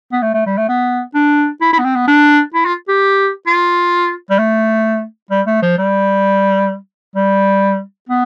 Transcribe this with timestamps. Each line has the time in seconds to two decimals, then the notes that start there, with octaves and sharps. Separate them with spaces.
0.12 B3
0.22 A3
0.34 A3
0.46 G3
0.58 A3
0.69 B3
1.15 D4
1.61 E4
1.73 E4
1.79 B3
1.85 C4
1.96 B3
2.08 D4
2.54 E4
2.65 F4
2.88 G4
3.47 F4
4.30 G3
4.39 A3
5.31 G3
5.47 A3
5.62 F3
5.78 G3
7.16 G3
8.09 B3